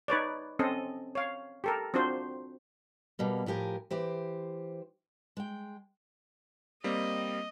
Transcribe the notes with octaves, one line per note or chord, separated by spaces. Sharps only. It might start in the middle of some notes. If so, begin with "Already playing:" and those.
D#4 B4 C#5 D5
C4 C#4 A4 D#5
C#5 F5
G4 A4 A#4
C4 D4 F4 F#4 C5
B2 G3 A#3
A2 F3 G4 A#4 G#5
E3 G4 C5
G#3 G5
G3 A#3 C4 D#5